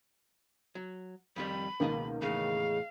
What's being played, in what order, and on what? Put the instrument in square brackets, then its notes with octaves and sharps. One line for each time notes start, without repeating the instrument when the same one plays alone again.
[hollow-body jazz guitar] F#3
[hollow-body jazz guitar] F2 D#3 G3 [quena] B5
[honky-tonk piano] C#2 D#3 A#3 [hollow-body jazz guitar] B2 B3 D#5
[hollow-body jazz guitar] E2 A2 [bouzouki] C#3 G#3 [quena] F5